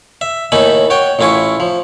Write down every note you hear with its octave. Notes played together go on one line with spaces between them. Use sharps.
E5
D#2 A2 D#4 A4 G#5 B5
F#4 C#5 G5
A1 A2 E4 F4 G#5 C#6
F3